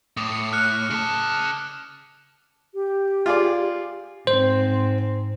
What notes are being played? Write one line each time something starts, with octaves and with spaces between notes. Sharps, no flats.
A2 D6 D#6 F7
C#7
F6 F#6 C#7
C#3 A5
G4
F4 G#4 D5
G#2 C4 C5